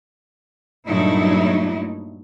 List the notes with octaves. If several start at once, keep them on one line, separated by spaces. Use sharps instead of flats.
G2 A#2 F#3 A3 D#4 E4